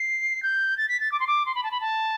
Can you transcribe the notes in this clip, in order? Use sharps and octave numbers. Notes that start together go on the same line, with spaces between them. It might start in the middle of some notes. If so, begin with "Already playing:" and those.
Already playing: C7
G6
A6
B6
A6
D6
C6
D6
C6
B5
A5
B5
A5